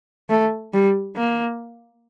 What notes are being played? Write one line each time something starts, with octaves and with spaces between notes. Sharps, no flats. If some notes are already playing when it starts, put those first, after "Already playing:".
A3
G3
A#3